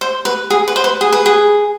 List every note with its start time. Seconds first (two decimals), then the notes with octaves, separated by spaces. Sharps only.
0.01 C5
0.25 B4
0.50 G#4
0.68 B4
0.76 C5
0.84 B4
1.01 G#4
1.12 B4
1.26 G#4